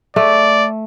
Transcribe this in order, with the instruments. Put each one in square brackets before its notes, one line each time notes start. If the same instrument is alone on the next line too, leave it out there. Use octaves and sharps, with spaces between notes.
[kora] A3 [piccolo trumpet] D5